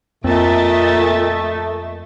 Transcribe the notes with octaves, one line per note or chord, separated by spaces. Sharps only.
F2 A#2 A3 C4 D#5 E5 A6